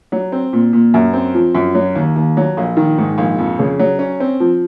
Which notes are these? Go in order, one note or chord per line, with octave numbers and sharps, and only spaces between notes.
F#3
C4
A#2
A#2
F#2
C4
F3
F#2
F#3
D#2
D#2
F#3
A#1
D#3
G#2
A#1
F2
C#3
F#3
C#4
C4
F3